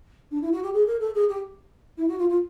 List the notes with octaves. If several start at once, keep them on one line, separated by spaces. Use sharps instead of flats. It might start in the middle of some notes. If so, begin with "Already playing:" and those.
D4
E4
F#4
G4
G#4
A#4
A4
G#4
G4
E4
F#4
F4
F4